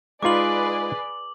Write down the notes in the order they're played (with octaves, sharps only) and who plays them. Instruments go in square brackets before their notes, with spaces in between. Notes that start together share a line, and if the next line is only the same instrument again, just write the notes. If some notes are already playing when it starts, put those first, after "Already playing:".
[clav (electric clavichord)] G#3 D#4 F4 [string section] G#4 B4 D5 [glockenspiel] D6 F#7